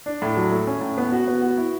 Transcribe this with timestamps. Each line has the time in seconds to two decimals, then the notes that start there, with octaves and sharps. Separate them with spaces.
0.06 D4
0.22 A2
0.37 F#3
0.52 A3
0.67 C#4
0.81 A2
0.98 B3
1.12 F#4
1.28 B3
1.42 F#4
1.57 E4